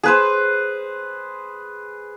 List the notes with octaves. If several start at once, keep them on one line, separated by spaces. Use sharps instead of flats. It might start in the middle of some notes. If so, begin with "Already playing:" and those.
G#4 B4 C5